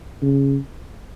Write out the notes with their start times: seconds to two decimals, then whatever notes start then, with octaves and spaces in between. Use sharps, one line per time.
0.22 C#3